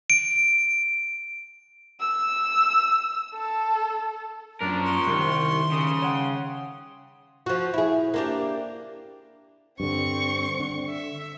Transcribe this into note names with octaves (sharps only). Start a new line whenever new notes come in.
D7
E6
A4
F#2 F3 C#4 D4 A#4
C6 C#6
C2 D#3 G3
C#3 D#6
C#5 F#5 G5
F3 F#4
E4 G#4
A#3 D4 G4
G2 D3 C4 C#6
D3
E5